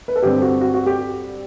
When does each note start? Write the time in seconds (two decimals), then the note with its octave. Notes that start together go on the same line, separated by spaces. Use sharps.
0.08 B4
0.16 A4
0.22 G2 D3 G3 C4 G4
0.42 F#4
0.61 F#4
0.74 F#4
0.86 G4